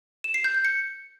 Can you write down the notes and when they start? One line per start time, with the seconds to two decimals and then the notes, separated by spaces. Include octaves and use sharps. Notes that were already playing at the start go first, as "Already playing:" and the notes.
0.24 E7
0.34 C7
0.44 G6
0.54 G6
0.65 C#7